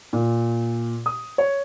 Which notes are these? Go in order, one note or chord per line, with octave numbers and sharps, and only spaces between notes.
A#2
D#6
C#5